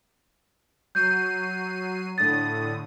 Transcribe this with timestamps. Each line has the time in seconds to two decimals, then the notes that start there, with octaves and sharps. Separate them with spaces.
0.95 F#3 G6 C7 D#7
2.18 A2 D3 D#6 A6